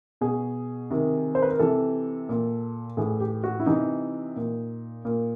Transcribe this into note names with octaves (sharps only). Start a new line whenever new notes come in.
B2 G#4
C3 D#3
C5
B4
A#4
C3 E3 A4
A#2
A2 E3 G#4
G4
F#4
E4
C3 E3 D#4
A#2
A#2